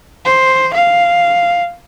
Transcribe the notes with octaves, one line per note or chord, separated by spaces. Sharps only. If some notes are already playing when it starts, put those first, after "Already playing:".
C5
F5